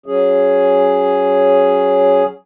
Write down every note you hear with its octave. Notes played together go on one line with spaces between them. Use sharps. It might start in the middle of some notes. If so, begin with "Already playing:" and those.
F#3 C#4 G#4